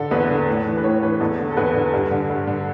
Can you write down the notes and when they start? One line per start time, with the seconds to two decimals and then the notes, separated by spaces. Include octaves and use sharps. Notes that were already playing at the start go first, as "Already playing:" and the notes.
Already playing: D3 A4
0.11 E2 B4
0.30 D3
0.48 A2
0.66 E3
0.77 B4
0.84 A2 C#5
1.03 E3 B4
1.20 E2 A4
1.39 D3
1.51 A4
1.57 E2 B4
1.74 D3
1.94 G2
2.11 D3
2.30 G2
2.47 D3